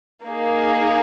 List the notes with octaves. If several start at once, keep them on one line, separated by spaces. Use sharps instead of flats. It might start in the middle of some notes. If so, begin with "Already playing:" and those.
A#3 D#4 G#4